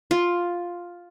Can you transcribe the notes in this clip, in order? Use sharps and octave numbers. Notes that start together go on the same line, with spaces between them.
F4